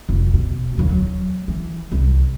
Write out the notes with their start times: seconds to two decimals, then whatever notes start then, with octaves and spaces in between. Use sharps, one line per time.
0.09 F1
0.34 B2
0.78 D#2 F#3
0.89 F#3
1.48 E3
1.92 C2